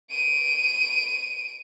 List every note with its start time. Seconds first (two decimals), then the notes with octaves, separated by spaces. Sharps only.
0.11 D7 D#7